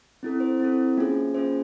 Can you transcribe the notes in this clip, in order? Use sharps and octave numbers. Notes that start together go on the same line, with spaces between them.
C4 E4 A4
C5
C4 E4 A4
A#3 C#4 F4 G#4
A#3 C#4 F4 G#4 C5